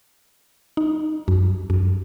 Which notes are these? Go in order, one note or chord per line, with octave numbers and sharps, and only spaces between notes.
D#4
F#2
F#2